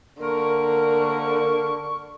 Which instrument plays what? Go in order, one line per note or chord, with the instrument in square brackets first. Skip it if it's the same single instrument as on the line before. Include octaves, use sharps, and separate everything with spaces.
[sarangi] D3 [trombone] A#3 [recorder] A#4 [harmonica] C#6